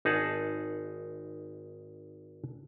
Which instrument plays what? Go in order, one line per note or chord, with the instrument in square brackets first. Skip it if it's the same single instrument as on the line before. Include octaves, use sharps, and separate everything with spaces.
[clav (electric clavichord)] G#1 D#4 G#4 F#5 A5